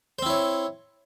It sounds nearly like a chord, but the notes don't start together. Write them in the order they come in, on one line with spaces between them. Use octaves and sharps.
C5 C4 E4 C#5